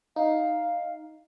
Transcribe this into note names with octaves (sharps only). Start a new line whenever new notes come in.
D#4 F5